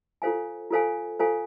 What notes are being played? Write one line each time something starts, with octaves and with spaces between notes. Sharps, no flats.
F4 A4 C5 F5 G#5
F4 A4 C5 F5 G#5
F4 A4 C5 F5 G#5